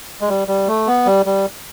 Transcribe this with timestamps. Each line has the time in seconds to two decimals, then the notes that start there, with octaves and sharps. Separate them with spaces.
0.21 G#3
0.29 G3
0.48 G3
0.68 A3
0.87 B3
1.06 G3
1.26 G3